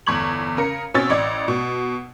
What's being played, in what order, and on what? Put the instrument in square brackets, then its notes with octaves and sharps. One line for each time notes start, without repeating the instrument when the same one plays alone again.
[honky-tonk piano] G1 E2 C#6 G#6 F#7
C#3 A#4 C#7
B2 C4 C#4 C#5 E6 A6
A1 D5 D#5 G#6
B2